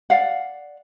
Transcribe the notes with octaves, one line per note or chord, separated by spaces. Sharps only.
D5 F5 F#5